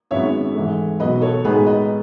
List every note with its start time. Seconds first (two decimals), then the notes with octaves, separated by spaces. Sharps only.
0.11 G#1 F#2 D#3 G#3 B3 C#5 E5
0.55 G#2 E3 A3
1.00 B1 B2 F#3 B4 D#5
1.22 A4 C#5
1.44 A2 G#3 B3 D#4 G#4 B4
1.66 B4 D#5